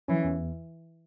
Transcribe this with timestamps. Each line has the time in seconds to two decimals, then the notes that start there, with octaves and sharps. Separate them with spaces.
0.08 E3 C#4
0.24 E2